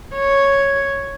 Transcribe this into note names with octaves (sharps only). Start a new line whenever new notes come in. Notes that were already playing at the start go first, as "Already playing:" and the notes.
C#5